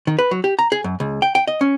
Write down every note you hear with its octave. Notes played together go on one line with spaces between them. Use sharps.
D#3
B4
F#3
G4
A#5
G#4
F#2
C#2
G5
G5
D#5
C#4